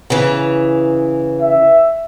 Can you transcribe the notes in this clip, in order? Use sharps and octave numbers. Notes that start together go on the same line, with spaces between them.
C#3 E3
E5